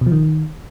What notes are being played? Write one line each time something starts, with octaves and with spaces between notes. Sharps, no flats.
B2
F3
D#3